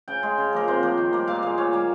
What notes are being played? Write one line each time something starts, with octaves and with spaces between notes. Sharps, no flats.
C#3 G5
G#3
C#3
F3 A#3 A#4
C3 C5
F3 A#3
D#3
G3 A#3
A#2 F5
G#3 F5
A#2 C#5
G3 A#3